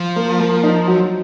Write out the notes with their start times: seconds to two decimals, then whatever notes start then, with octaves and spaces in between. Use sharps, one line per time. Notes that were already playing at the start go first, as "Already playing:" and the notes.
Already playing: F3
0.16 A#3
0.40 A#3
0.64 D#4
0.88 F#3